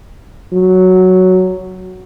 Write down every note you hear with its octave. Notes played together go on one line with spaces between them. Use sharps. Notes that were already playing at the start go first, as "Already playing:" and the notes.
F#3